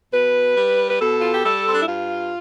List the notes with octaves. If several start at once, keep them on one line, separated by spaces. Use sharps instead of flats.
B2 B4
G3
B4
B2 A4
F4
G4
G3 A4
C4
D4
E4
G2 F4